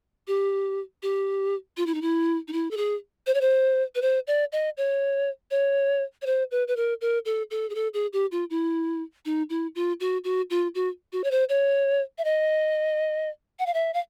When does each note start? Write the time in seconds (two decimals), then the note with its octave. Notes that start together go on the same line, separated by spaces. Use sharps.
0.28 G4
1.03 G4
1.77 F4
1.86 E4
1.94 D#4
2.02 E4
2.48 D#4
2.53 E4
2.71 A4
2.77 G#4
3.27 C5
3.34 C#5
3.41 C5
3.95 B4
4.02 C5
4.27 D5
4.52 D#5
4.77 C#5
5.51 C#5
6.22 C#5
6.26 C5
6.51 B4
6.68 B4
6.77 A#4
7.01 A#4
7.25 A4
7.51 A4
7.70 G#4
7.75 A4
7.94 G#4
8.13 G4
8.32 F4
8.50 E4
9.25 D#4
9.50 E4
9.75 F4
10.00 F#4
10.24 F#4
10.50 F4
10.75 F#4
11.13 F#4
11.24 C#5
11.31 C5
11.49 C#5
12.18 E5
12.25 D#5
13.59 F#5
13.66 F5
13.74 E5
13.94 F5